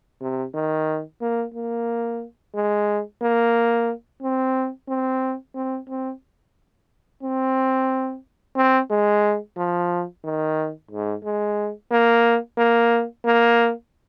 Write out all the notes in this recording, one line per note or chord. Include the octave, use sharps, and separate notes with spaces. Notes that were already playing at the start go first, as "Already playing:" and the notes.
C3
D#3
A#3
A#3
G#3
A#3
C4
C4
C4
C4
C4
C4
G#3
F3
D#3
G#2
G#3
A#3
A#3
A#3